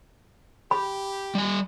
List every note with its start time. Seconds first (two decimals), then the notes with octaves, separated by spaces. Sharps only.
0.71 G4 B5
1.35 G3 G#5